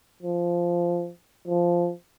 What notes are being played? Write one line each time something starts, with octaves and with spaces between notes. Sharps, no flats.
F3
F3